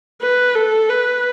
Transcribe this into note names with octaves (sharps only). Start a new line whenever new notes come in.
B4
A4
B4